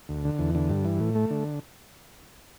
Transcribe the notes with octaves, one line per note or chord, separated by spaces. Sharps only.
D2
D3
E2
D3
G2
E3
A2
A3
D3